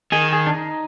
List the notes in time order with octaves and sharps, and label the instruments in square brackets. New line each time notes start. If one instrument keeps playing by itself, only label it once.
[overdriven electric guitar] D#3 [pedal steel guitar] G#4
[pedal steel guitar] G#4
D4
D#4